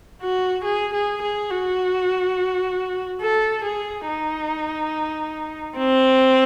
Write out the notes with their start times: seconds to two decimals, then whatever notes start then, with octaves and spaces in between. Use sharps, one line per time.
0.22 F#4
0.65 G#4
0.93 G#4
1.22 G#4
1.50 F#4
3.21 A4
3.65 G#4
4.08 D#4
5.78 C4